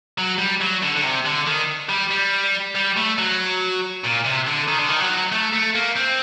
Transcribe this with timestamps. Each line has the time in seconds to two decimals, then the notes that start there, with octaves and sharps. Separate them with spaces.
0.18 F#3
0.38 G3
0.61 F#3
0.82 D3
0.96 D3
1.03 C3
1.25 D3
1.46 D#3
1.89 G3
2.11 G3
2.75 G3
2.97 A3
3.18 F#3
4.04 A#2
4.25 C3
4.47 D3
4.68 D#3
4.78 D3
4.88 D#3
5.00 F#3
5.32 A3
5.53 A3
5.75 A#3
5.96 C4